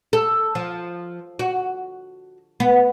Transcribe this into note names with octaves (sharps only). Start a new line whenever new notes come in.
A4
F3
F#4
B3